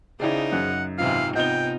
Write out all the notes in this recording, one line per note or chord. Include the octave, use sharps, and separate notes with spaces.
C#3 D#4 E4 G#4 C5 D5 G5
F#2 F#5
G#2 C3 E3 D#4 F4 F5
C3 B3 D#4 F4 D#5 F#5 G5 G7